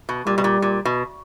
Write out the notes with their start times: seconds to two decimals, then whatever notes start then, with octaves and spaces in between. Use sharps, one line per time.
0.09 B2
0.26 A#2 G3
0.38 B2
0.44 A#2
0.62 A#2
0.85 B2